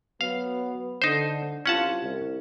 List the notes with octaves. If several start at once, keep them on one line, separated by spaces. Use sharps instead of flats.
F#3 B3 F5
D3 D#4 C5
C2 C#4 F4 F#5 A5
C2